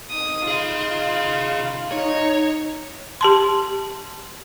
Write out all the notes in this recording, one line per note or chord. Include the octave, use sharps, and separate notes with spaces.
D#4 D#6
F4 G#4 F5
D#4 C#5
G4 A5 C6